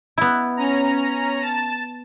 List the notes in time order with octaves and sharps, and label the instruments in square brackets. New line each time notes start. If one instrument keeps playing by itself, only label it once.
[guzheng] B3 E4
[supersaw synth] C#4 A#5
A5